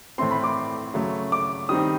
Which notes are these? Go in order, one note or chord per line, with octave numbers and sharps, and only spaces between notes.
A2 E3 A3 C4 C6
B5
D6
C#3 F#3 A3
D6
D#3 G3 C4 D#4 D#6